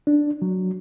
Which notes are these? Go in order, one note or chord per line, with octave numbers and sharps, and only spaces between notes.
D4
F#3